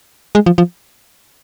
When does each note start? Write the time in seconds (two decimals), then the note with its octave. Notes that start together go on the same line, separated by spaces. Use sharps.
0.35 G#3
0.46 F3
0.58 F3